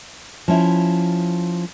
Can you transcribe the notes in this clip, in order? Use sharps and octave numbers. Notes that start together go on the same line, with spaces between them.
F3 C#4 E4